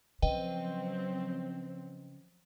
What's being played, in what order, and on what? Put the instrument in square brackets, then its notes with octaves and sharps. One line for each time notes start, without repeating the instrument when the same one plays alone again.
[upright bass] C#3 [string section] F3 F#3 C4 [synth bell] B4 D#5 G5